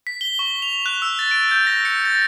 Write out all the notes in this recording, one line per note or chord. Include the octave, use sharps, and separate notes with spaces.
B6
G7
C#6
F7
F#6
E6
A6
D7
G6
A#6
C#7
A6